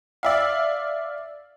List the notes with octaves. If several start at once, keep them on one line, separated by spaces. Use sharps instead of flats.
D5 E5 F5